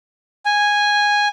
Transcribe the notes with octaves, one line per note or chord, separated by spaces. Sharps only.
G#5